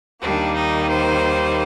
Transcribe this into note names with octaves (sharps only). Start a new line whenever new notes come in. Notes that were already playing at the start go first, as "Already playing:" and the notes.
D#2 D#3 G3 A#3 D4
D#4
C5